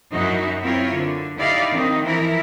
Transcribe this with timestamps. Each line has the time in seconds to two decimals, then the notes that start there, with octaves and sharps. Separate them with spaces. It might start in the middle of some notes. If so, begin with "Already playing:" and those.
0.12 F#2 D#4 E4 F#4 E5
0.61 C4 E4 F4 A#4 C#5
0.94 D3
1.39 D#4 E4 G4 D5 F5
1.72 D#3 C4 D#4
2.05 E3 F3 E4 A#4